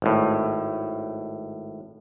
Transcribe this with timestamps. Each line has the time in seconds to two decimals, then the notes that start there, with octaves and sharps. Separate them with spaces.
0.02 G#1 A2